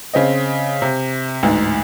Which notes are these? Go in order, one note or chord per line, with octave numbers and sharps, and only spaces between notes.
C#3 C4 D#5
C3
A1 D2 G#2